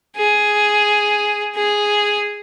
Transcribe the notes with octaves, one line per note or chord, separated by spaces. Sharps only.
G#4
G#4